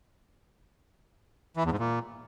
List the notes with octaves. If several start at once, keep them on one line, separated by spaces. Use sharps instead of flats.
E3
E2
G#2
A#2